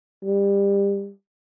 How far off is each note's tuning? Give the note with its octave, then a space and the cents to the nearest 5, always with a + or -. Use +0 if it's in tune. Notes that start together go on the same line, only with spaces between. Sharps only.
G3 +25